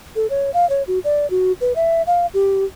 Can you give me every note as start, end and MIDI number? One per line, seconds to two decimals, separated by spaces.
0.16 0.27 69
0.30 0.51 73
0.54 0.68 77
0.70 0.83 73
0.87 0.99 66
1.04 1.29 74
1.30 1.52 66
1.61 1.73 71
1.76 2.02 76
2.07 2.26 77
2.34 2.65 67